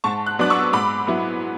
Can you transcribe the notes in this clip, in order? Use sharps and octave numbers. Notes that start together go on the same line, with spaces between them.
G#2 A5 C#6
F#6
F#3 B3 D4 D6 F#6
C#6 E6
G#2 B5 D6
F#3 B3 E4